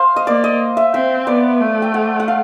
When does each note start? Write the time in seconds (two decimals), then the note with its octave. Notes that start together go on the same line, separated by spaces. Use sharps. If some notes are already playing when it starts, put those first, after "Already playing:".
Already playing: C5 F5
0.16 D#5
0.26 A#3 D5
0.44 D#5
0.77 E5
0.94 C4 E5
1.27 B3 D5
1.61 A3
1.82 G5
1.94 F#5
2.20 F#5
2.28 F5